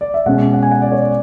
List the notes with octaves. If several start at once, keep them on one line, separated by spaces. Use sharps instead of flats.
D5
E5
B2 G#3 C#4 F#5
F#5
G#5
F#5
D5
C#5
D5